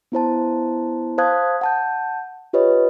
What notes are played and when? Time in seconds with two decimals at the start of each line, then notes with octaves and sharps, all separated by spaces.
0.12 B3 E4 C5 A5
1.18 C5 F5 A5 D#6 F#6 G#6
1.61 F#5 A5 G6
2.53 F4 G4 B4 C#5 D#5